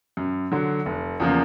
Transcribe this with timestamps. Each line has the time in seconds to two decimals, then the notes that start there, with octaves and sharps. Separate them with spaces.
0.17 F#2
0.52 D3 F#3
0.86 F1
1.20 E2 C#3 F3 A#3